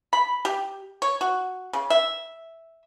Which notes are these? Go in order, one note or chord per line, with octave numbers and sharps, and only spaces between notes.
B5
G4
C#5
F#4
C#3
E5